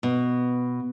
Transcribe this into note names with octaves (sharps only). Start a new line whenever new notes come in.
B2